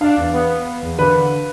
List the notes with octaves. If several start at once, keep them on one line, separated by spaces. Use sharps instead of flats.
D4 F5
E2
B3
B3
B3
E2
D3 B4
D3